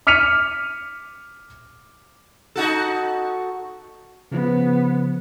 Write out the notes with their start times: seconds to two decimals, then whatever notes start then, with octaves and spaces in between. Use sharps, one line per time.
0.07 D6 F6 B6 C#7 D#7 F7
2.56 D#4 F#4 A4
4.32 C#3 F3 B3